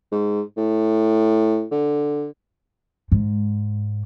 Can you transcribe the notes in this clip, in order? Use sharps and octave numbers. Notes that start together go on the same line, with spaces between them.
G#2
A2
D3
G#2